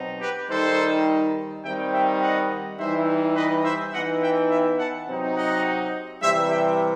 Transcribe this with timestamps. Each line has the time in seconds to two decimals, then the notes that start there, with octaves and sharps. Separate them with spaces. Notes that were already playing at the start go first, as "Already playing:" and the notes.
Already playing: B2 F#3 C4 D#4
0.21 G4 B4
0.50 D#3 G3 D#4 A4 C5
1.64 D#3 G3 C4 D#4 E5 G5
1.93 E5 G5
2.21 D#5 F#5
2.79 E3 G3 D#4 C5 E5
3.36 B4 D#5
3.64 C5 E5
3.93 E3 B3 D#4 D#5 F#5
4.22 E5 G5
4.50 E5 G5
4.79 F#5 A5
5.07 C3 F#3 C4 D#4
5.36 D#5 F#5
6.22 C3 E3 G3 C5 E5
6.50 E5 G5